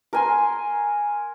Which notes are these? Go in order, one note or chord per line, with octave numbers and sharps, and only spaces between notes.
A#4 G#5 C6